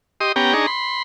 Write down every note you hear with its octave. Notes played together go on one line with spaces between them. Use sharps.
G4 D#5 C6 D#6
B3 C#4 G4 G5 A#5
D4 D#4 G#4 A#5 C#6
B5 C6